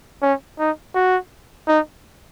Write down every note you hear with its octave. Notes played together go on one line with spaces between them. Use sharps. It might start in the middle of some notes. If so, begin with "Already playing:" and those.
C#4
D#4
F#4
D#4